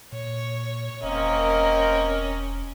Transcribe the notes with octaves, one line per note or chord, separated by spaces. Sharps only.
A#2 C#5
E1 A#3 C4 C#4 A#4 D#5